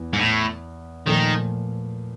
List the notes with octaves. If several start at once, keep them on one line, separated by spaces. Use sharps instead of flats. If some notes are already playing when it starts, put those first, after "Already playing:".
Already playing: E2
G#2
A2
A#2 D#3 F3 A3